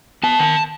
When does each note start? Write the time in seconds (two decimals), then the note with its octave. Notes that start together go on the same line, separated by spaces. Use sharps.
0.23 B3 A5
0.40 D#3